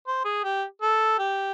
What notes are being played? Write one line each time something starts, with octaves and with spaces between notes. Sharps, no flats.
C5
G#4
G4
A4
G4